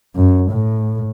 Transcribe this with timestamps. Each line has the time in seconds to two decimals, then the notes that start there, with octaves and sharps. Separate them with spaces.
0.16 F#2
0.52 A2